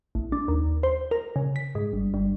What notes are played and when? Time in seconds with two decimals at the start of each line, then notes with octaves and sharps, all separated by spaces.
0.15 A1
0.32 D4
0.48 D#2
0.83 C5
1.11 A#4
1.36 C#3
1.56 B6
1.75 G#2
1.93 G1
2.14 G1